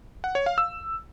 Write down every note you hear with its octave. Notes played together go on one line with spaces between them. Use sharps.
F#5
C#5
F5
E6